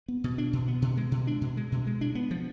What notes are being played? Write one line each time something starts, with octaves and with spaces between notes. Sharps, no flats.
B3
B2
D4
B2
B3
B2
G#3
B2
D4
B2
G#3
B2
G#3
D4
B3
F3